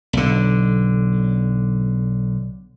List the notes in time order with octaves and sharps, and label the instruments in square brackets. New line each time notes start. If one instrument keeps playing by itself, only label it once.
[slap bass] B1 D3